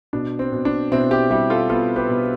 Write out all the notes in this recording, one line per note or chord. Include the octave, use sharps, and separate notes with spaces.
B2 D4
C4
B2
D4
B2 C4 E4
E4 G4
G3 E4 G4
F4 A4
B3 F4 A4
G4 B4
B2